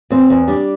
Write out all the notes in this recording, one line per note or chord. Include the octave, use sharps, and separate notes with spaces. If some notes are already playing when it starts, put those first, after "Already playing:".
E2 C4
E2
G3 D4